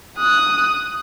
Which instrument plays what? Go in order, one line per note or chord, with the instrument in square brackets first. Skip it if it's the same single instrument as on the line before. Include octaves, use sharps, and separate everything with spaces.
[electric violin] D#6 F#6